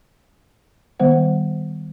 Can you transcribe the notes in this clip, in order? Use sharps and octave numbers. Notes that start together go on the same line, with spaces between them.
D#3 G3 B3 C5 F#5